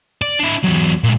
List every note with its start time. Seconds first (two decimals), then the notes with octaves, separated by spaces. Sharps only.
0.22 D5
0.40 D4 E4
0.64 E2 F#3
1.04 A#2 G#3